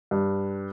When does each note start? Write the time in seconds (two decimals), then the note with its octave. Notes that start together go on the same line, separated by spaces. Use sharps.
0.11 G2